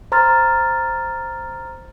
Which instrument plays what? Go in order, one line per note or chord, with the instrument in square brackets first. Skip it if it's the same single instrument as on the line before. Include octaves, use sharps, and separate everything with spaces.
[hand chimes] C5 A#5 C6 F6 A6